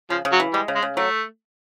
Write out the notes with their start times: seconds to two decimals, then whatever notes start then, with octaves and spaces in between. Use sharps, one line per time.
0.10 C#3 F3
0.25 C#3
0.32 F#3
0.40 E3
0.54 G3 G#3
0.68 C#3
0.76 G#3
0.82 C#3
0.97 F#3 A3